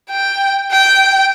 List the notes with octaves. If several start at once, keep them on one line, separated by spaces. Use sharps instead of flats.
G5
G5